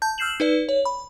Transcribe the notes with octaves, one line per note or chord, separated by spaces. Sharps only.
A5 G6
E6 F6 G6 C7 E7 F#7
D#4 B4 D5
C#5
B5